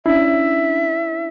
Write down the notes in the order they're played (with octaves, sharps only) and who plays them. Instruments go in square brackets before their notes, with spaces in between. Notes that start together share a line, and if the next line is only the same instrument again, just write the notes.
[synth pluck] C#4 D4 [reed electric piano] E4 [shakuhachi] E5